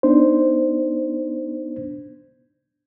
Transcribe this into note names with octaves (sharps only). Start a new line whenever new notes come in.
B3 D4 D#4 C5